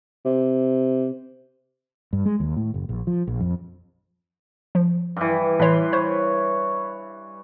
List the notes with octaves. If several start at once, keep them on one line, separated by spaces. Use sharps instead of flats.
C3
G2
G#3
D#2
A2
F#1
A#1
F3
A#1
F2
F3
G2 E3
A2 E3 B4 C#5 C6
C5 C#5